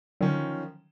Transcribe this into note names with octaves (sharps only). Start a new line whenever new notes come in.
D3 D#3 F3 F#3 C#4